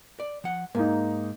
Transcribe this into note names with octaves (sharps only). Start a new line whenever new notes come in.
D5
F3 F#5
G#2 A#3 D#4